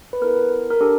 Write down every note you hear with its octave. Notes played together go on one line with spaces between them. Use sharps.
B4
B3 E4 A4 A#4
A#4
D4 G4 A4